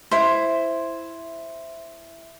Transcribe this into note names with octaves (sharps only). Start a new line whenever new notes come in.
E4 C5